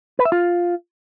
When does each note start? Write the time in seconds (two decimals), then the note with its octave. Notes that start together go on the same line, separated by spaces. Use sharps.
0.19 B4
0.25 E5
0.32 F4